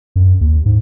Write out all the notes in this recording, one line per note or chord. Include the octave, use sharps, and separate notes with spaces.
F#2
D#2
G#2